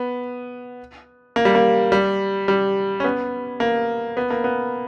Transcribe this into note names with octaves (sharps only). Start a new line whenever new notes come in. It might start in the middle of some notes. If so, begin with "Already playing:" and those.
Already playing: B3
A#3
G3
A#3
G3
G3
C#4
B3
A#3
B3
A#3
B3